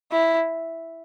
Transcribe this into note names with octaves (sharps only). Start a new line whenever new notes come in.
E4